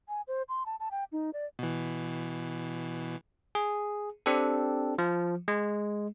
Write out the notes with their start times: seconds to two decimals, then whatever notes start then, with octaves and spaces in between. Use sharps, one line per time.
0.08 G#5
0.28 C5
0.49 C6
0.66 A5
0.80 A5
0.91 G5
1.12 D#4
1.33 D5
1.59 B2 E3
3.55 G#4
4.26 C4 D4 G4 A4
4.98 F3
5.48 G#3